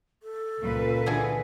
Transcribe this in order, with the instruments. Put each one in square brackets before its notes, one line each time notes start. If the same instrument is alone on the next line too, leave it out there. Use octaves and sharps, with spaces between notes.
[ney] A4
[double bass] C#2 [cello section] A#2 B4
[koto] D3 E3 G#4